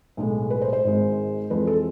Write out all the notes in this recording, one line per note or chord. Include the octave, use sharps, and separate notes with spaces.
B1 A2 G#3
B4
C5
C5
G#1 G#2 G#3
F2 E3 G#3 B4
A4